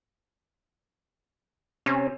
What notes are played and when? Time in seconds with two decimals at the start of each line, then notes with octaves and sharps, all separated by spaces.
1.86 C3 C#4